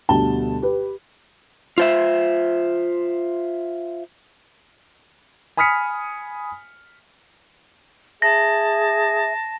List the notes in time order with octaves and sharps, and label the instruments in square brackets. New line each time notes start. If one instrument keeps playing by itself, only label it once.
[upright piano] D2 B2 G3 A5 G7
G4 B4
[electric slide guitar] F4 C5 E5
[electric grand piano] G#5 B5 D#6 F6 B6 C#7
[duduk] G#4 [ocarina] E5 [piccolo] A5 [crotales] A#6